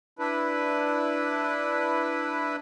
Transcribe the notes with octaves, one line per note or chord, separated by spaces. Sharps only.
D4 E4 B4